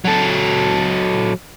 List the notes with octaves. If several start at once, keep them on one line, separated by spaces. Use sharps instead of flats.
F#3 A4